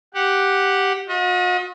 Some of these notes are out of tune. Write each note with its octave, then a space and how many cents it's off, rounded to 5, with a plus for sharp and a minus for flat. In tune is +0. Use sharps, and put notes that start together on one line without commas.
G4 +0 F#5 +0
F#4 -45 D#5 +35